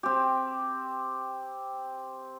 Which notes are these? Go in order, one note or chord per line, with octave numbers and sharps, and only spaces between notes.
C4 G4